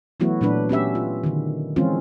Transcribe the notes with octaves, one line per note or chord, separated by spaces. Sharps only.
E3 F#3 A3 B3 E4 F#4
A#2 F#3 A3 D4 B4
B3 C#4 G4 E5
F4
D3 D#3
E3 F3 G#3 C4 C#4 F4